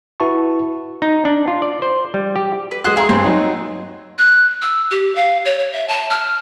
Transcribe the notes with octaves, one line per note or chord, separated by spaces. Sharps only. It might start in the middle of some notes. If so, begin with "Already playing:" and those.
E4 F#4 B4 E5 A5 C#6
D#4
D4
F4
D5
C5
G3
G4
B4
G#3 F#4 G#4 C5 F#6
E4 G#4 F5 A#5 C6
G2 C4 C#5
F#3 D#4
F#6
E6
G4
F5
C#5
C#5
E5
A5
F6